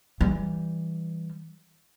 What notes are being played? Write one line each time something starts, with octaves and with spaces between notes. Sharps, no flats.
E3 G3